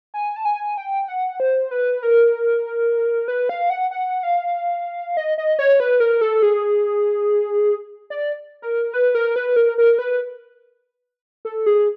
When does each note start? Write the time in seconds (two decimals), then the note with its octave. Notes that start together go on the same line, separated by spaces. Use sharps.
0.14 G#5
0.36 A5
0.45 G#5
0.78 G5
1.08 F#5
1.40 C5
1.71 B4
2.03 A#4
3.28 B4
3.49 F5
3.70 F#5
3.91 F#5
4.23 F5
5.17 D#5
5.38 D#5
5.59 C#5
5.80 B4
6.00 A#4
6.21 A4
6.43 G#4
8.10 D5
8.62 A#4
8.94 B4
9.15 A#4
9.36 B4
9.56 A#4
9.78 A#4
9.99 B4
11.45 A4
11.66 G#4